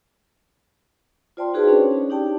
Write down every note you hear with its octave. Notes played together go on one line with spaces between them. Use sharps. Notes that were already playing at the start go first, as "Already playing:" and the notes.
F4 C5 D5 G5 A5 C6
D#4 F#4 G#4 B4 C5 F5
C#4 D4 C#5
D4 D#4 G4 D5 G5 A5